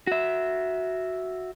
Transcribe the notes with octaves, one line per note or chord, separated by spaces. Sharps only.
F#4 E5